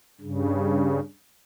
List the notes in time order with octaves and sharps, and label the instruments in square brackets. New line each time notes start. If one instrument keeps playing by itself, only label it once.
[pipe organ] G2 C#3